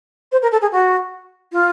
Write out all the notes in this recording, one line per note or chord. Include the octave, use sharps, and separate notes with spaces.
C5
A#4
A4
G#4
F#4
F4